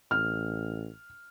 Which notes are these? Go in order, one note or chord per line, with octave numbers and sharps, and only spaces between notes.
A1 F6